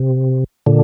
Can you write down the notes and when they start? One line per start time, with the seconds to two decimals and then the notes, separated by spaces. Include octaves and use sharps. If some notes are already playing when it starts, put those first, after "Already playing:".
Already playing: C3
0.66 A#2 D3